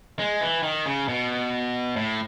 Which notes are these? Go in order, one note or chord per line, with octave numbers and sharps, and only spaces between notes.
G#3
E3
D#3
C#3
B2
A2